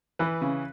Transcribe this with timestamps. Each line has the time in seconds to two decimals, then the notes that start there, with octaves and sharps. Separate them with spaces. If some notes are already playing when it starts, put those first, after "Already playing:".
0.19 E3 B4
0.42 C#3